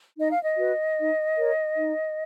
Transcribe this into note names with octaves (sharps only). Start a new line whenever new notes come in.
D#4 D#5
F5
D#5
F#4 B4
D#4
A#4 C#5
D#4